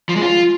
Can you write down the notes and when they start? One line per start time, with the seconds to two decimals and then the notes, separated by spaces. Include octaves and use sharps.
0.09 F3
0.16 G#3
0.23 F4